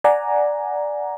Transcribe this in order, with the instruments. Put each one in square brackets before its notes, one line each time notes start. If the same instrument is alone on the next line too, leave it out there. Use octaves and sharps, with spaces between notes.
[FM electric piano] D5 F#5 G#5 A#5